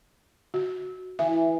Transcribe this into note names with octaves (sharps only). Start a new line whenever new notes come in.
F#4
E3 E5